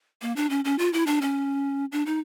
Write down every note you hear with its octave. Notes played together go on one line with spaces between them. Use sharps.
A#3
D4
C#4
C#4
F4
E4
D4
C#4
D4
D#4